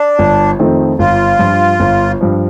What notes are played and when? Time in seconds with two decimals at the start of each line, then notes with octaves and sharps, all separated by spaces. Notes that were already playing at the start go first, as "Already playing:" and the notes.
Already playing: D4
0.19 G1
0.59 F2 D#3 A3 C4
0.99 G1 F4
1.39 G2 F3
1.80 G1
2.21 G2 F3